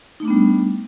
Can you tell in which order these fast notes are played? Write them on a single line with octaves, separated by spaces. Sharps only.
D#4 A3 D4 B3 G3